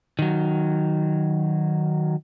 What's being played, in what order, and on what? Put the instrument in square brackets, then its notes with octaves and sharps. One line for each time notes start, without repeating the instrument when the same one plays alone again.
[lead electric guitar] D#3 F#3